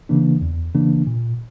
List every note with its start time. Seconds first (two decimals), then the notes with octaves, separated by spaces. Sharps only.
0.09 C#3 E3 A#3 D4
0.41 E2
0.75 C#3 E3 A#3 D4
1.07 A#2